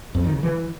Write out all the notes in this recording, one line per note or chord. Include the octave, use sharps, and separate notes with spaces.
F2
D#3
C#3
E3